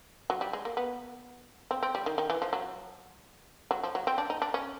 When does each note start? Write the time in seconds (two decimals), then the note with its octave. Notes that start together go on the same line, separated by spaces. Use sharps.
0.30 F#3
0.41 G3
0.53 G#3
0.65 A#3
0.77 B3
1.71 C4
1.83 C4
1.95 G3
2.06 D#3
2.18 D#3
2.30 E3
2.42 F3
2.53 F#3
3.71 F#3
3.83 F3
3.95 F#3
4.07 C4
4.18 D4
4.30 D#4
4.42 D4
4.54 C#4